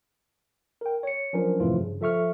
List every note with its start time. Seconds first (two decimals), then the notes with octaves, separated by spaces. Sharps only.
0.81 A#4 G5
1.03 C#5 C#7
1.33 F3 F#3 C#4 D4 A#4 C5
1.60 F2 A2 C3 E3 F3 F4
1.76 G2 C#3
2.00 F3 A4 E5 C#6 F6